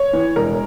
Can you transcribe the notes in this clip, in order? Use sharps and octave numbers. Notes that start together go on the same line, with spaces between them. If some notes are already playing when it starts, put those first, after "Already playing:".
Already playing: C#5
E3
E1 A#4